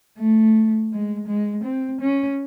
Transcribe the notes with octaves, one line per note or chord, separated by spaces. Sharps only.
A3
G#3
G#3
C4
C#4